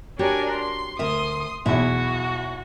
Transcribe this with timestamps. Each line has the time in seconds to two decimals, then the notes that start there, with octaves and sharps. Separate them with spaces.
0.19 D4 F#4 G4 A#4 C#5 G#5
0.52 C6
0.99 D2 A#4 E5 C6 D#6
1.66 B1 E2 E4 F#4